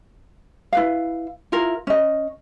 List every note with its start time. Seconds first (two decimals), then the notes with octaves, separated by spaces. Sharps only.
0.73 E4 B4 F5
1.52 E4 F4 A#4
1.87 C#4 D#5